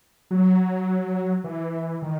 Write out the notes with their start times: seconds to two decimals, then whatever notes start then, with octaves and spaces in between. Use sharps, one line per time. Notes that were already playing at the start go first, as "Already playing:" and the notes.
0.31 F#3
1.44 E3
2.02 D#3